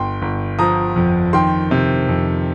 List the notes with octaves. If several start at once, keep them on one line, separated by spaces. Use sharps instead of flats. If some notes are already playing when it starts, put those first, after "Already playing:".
Already playing: G1 G5 C6
G1
F3 A#5 D#6
F2
D#3 G5 C6
C3
F2